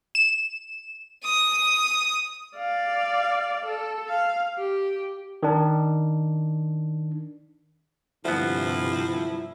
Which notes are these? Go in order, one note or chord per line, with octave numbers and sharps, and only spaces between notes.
E7
D#6
D5 F5
A4
F5
G4
D#3 D4
D2 G2 C3 F3 B3 E4